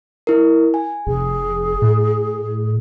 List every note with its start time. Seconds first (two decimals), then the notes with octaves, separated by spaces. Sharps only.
0.27 E4 A#4
0.74 G#5
1.07 F1 G#4
1.82 A2